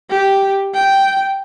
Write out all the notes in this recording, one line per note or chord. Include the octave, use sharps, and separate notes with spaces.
G4
G5